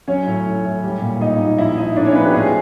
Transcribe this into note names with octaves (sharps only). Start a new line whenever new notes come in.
F#3 C#4 C#5
A2
A2
A2
G3
A#2
A#2 D#4 D#5
A#2
F3 E4 E5
F3 D#4 D#5
A2 D4 D5
C#4 C#5
F3 B3 B4
G4
A2 G#3 G#4